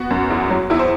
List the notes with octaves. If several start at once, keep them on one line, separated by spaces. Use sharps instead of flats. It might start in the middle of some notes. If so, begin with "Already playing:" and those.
Already playing: B3 F#4
F#2
E2
F#3
E2 E4
C5